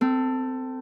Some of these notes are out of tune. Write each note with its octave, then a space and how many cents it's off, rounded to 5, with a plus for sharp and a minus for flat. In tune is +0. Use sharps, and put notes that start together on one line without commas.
C4 -20 A4 +15